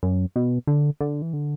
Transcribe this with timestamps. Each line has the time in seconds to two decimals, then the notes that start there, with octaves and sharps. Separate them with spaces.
0.03 F#2
0.36 B2
0.67 D3
1.01 D3
1.22 E3
1.33 D3